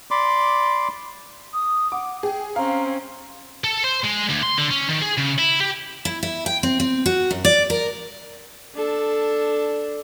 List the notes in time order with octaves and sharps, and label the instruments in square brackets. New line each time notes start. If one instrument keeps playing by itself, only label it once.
[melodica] D5 B5 C6 D6
[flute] D#6
[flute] F#5 [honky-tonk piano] D6
[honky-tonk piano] G#4 [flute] G5
[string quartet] C4 C#4 [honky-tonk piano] F5 [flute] A#5
[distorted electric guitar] A4
C5
G#3
D2
C6
D3
C#4
D#3
G#4
C#3
E4
G4
[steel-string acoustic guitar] E4
E4
G5
C4
C4
F#4
F#2
D5
A#4
[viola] D4 A4